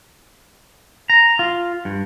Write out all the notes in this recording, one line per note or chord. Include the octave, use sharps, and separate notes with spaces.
A#5
F4
G2